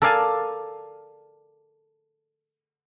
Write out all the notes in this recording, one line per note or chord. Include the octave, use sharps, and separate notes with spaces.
A4 A#4 D5 F5 G#5 A5